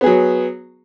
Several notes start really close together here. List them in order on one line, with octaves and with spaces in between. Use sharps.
B3 G#4 F#3